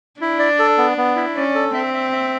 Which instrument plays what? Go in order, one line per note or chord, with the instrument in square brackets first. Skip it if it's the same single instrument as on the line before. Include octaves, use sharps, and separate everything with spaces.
[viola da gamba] D4 [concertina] E4
[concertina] D5
A4
B3
B3
E4
[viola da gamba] C#4 [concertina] D5
[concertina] A4
[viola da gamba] C4 [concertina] E5
[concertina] E5
E5